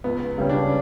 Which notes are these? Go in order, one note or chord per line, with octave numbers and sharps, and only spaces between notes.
C#2 B3
C#3 G3 C#4
D4